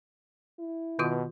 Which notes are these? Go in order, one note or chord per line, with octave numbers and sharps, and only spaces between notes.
E4
B2 D#3 F4 F#4